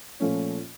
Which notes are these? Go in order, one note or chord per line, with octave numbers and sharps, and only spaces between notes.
A#2 F3 A3 C#4